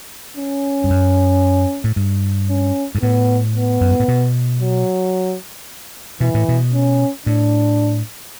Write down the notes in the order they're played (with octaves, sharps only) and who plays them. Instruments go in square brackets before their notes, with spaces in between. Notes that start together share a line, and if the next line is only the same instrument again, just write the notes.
[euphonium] C#4
[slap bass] G2
F#2
A2
G2
[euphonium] C#4
[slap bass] G2
[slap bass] A2 [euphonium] B3
[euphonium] B3
[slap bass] F#2
G2
A2
B2
[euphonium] F#3
[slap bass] B2 [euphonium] E3
[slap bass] A2
B2
[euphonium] C#4
[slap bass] A2 [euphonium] D4